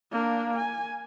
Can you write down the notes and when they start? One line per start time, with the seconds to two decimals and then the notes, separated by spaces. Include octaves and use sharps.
0.11 A#3 D4
0.56 G#5